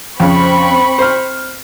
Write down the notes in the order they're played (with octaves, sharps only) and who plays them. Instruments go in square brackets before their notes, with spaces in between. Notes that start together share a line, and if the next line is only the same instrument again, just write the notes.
[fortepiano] F2 C#3 [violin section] C4 B5 C#6
[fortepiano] C5 F6